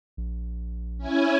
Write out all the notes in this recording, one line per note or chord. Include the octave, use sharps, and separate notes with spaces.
A#1
C#4 E4 G#5